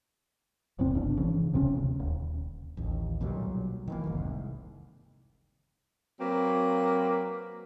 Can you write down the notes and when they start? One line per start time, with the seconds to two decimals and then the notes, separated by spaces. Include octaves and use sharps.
0.79 D1 E2 C3 C4
0.95 G1 C#3 D4
1.17 C#3 E3
1.54 D1 C3 C#4
1.75 D2
2.00 D#1
2.77 A1 D#2
3.21 B1 A#2 F#3 G3
3.88 D#3 E3 A#3
4.05 F1 C2 G#2
6.20 F#3 A#3 C4 B4